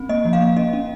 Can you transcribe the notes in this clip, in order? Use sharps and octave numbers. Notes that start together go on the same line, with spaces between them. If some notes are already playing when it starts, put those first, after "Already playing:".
Already playing: C4
A#3 D#5
F3
F5
A#3
C#4 D#5
C#4